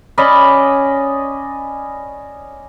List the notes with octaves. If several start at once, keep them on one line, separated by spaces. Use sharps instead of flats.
C#4 D5 D#5 B5